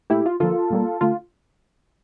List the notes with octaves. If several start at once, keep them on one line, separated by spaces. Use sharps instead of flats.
A#2 A3 E4 G4
F4
D3 F3 A#3 F4 A4
A#2 G3 A#3
D3 A3 F4